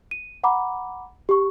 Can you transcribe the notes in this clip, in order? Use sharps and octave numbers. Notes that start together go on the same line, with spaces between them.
D#7
F#5 A#5 B5 D6
G4 C#6